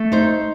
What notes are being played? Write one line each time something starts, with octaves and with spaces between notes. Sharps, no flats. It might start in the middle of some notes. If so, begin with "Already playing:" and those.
Already playing: A3
D#4 C5